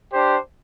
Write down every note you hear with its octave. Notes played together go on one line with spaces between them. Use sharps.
D4 G4 C5